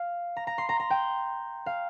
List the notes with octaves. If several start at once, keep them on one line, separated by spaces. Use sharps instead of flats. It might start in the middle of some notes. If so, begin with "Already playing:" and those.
Already playing: F5
A#5
A#5
C6
A#5
A#5
G5
F5